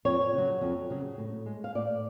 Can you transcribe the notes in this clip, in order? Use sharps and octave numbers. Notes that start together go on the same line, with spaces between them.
F2 C#5
C#3
F#3
F2
C#3 F#3
A2
G#3
F5
A2 D5